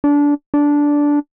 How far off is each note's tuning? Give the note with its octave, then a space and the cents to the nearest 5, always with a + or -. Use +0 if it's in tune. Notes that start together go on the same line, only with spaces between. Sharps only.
D4 -20
D4 -10